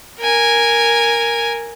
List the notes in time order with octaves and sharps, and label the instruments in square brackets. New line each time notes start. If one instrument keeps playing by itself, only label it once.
[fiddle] A#4 G#5